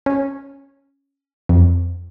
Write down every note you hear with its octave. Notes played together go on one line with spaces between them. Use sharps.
C#4
F2